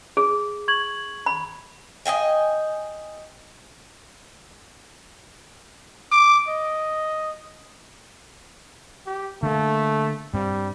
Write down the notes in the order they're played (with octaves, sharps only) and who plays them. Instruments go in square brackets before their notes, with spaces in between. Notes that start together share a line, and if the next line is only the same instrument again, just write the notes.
[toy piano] G#4
[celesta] C#6 G#6 F#7
[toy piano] B5
[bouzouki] D#5 F5 G5 G#5
[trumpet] D6
D#5
[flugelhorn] G4
[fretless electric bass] D3 A#3 [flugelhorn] A3
[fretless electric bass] G2 C4 [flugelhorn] G3